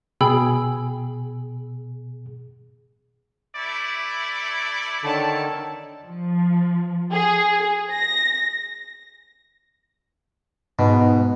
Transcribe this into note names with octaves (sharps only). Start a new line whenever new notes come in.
B2 G#4 G5 B5 E6
A3 E4 D5
D3 D#3 A4 C#5 A5
F3
G#4
A#6
G#2 B2